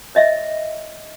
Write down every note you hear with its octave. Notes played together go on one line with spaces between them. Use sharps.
C#5 D#5 E5